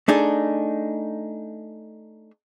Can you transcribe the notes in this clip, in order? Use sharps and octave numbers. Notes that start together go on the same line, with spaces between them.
A3 D4 D#4 G#4